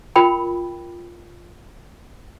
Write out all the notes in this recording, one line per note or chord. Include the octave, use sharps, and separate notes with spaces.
F4 A#4 G5 B5